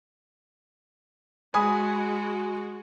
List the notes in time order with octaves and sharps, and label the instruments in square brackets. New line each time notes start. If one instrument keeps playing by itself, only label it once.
[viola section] G#3 F#4 [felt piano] G#5 B5 D#6